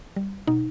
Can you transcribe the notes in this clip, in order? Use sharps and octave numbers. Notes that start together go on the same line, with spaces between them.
G3
B2 D#4